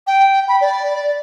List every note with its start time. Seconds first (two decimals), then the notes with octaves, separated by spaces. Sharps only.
0.07 G5
0.48 B5
0.61 D5